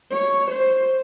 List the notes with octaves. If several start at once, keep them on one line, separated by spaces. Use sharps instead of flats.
C#5
C5